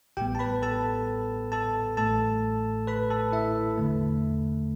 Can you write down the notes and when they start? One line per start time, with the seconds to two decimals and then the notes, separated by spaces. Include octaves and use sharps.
0.17 A1 A2 G3 B3 G4 G5
0.35 A5
0.39 B4 B5
0.62 A4 A5
1.52 A4 A5
1.97 A1 A2 A3 A4 A5
2.87 B4 B5
3.10 A4 A5
3.32 E4 E5
3.77 E2 D3 A3